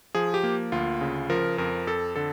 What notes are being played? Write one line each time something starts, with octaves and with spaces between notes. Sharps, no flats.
F3 G#4
G4
A#3
D2 F4
C#3
F3 A#4
F2 A#4
F2 A4
D3 A4